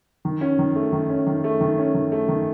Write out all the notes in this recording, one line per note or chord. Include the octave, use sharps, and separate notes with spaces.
D#3
C#4
D#3
A3
D#3
C#4
D#3
A3
D#3
C#4
D#3
A3
D#3